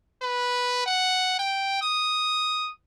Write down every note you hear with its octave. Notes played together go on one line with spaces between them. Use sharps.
B4
F#5
G5
D#6